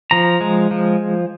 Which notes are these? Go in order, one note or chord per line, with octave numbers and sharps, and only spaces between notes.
F3 A#5
G#3
F3